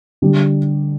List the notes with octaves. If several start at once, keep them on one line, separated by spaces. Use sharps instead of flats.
D3 G3 D4 G4